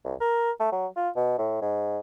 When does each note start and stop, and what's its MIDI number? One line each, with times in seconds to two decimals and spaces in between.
0.05 0.15 36
0.21 0.51 70
0.60 0.71 57
0.72 0.87 54
0.96 1.09 65
1.16 1.38 47
1.38 1.60 45
1.62 1.99 44